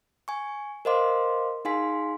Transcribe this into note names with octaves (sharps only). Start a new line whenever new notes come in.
G#5 C#6
A#4 C5 D#5 F5 C6 D6
D#4 G#4 F5 G#5 C6 B6